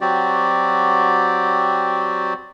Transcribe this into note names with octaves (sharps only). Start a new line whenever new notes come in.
F#3 C4 F#4 G4 D5